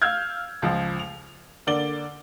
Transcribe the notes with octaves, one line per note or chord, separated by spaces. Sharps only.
F5 E6 F6 G6 G#6
C#2 F3
F7
D3 A#3 D5 G7